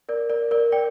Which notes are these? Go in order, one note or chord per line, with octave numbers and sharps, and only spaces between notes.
A#4 D5
A#4 D5
A#4 D5
D5 G5